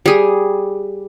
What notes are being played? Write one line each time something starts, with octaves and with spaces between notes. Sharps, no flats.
G3 G#4